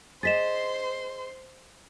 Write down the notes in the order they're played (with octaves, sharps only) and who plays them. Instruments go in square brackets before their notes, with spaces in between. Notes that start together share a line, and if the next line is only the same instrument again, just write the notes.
[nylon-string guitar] G#4 D#5 [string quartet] C5 C6 [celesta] A6 B6 E7